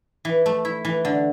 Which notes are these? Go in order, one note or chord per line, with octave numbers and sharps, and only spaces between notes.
E3
A3
E4
E3
D3